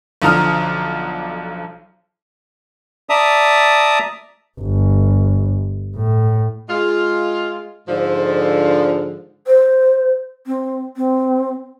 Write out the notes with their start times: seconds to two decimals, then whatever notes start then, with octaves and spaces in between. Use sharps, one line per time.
0.22 B1 D3 F3 A#5 D#6 F6
3.09 D5 E5 A5 A#5 D#6
4.60 G1
5.96 A2
6.69 G#3 F4
7.88 G#2 D3 F3
9.47 C5
10.47 C4
10.97 C4